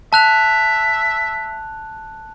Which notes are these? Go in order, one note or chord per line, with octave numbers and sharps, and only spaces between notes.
E5 A5 F#6 F7